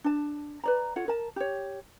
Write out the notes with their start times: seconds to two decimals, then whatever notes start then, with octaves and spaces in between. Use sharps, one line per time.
0.04 D4 A5
0.64 B4 D5 A#5
0.96 F4 A4 C#5 F#5
1.08 A#4 A5
1.36 G4 C#5